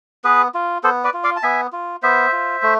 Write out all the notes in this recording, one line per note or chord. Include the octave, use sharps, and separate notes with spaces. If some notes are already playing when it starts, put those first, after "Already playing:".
B3 G#4 B4
F4
B3 A4 C5
B4 D5
F4
D5 F5
A5
B3 E5 G#5
F4
B3 C5 E5
F4
A3